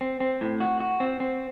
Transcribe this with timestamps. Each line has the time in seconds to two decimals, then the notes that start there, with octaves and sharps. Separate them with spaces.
0.01 C4
0.20 C4
0.41 A2
0.60 F#4
0.80 F#4
1.00 C4
1.20 C4